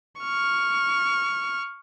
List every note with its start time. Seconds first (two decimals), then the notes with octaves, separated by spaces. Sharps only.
0.21 C#6 F6